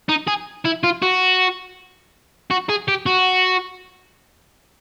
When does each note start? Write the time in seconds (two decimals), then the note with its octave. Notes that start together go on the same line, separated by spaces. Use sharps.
0.09 D#4
0.28 G#4
0.65 E4
0.83 F4
1.02 F#4
2.51 F#4
2.70 G#4
2.88 G4
3.06 F#4